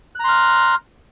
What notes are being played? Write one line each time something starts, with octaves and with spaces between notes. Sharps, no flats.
A#5 C6 F6 F#6